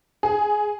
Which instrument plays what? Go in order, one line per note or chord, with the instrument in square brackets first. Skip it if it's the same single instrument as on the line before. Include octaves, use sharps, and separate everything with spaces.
[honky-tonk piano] G#4